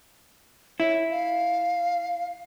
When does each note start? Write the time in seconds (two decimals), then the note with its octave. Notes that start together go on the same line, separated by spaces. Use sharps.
0.80 E4 C#5
1.10 F5